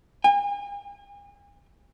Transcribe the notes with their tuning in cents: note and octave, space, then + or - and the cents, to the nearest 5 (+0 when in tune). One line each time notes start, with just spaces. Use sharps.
G#5 -40